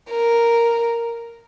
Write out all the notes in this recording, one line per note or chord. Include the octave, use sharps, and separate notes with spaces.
A#4